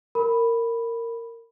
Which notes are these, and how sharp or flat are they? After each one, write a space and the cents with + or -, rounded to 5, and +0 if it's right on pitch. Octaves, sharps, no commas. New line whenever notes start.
A#4 -15 B5 +0